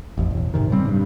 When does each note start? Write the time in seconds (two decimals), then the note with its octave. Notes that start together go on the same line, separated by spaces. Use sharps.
0.18 A1 F2
0.31 E1
0.54 G#2 C3 D#3
0.70 A2 C#3 G3 C4
0.88 G2